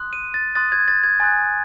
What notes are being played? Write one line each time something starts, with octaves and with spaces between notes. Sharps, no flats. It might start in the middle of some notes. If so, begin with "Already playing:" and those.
Already playing: C6 D#6 F#6
D#7
A6
C6 D#6 F#6 A6
G#6
A6
G#6
G#5 C6 D#6 F#6 A6